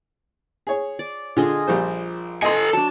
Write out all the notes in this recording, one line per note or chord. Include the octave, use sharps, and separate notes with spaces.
G#4 C#5
D5
D3 F4 G#4 D#5
A#1 G3 C5
A4 D#5 G#5 C6
F#3 D4 A5